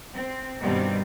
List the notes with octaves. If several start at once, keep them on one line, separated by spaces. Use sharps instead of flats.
C4
G2 B2 D#3 G3 C4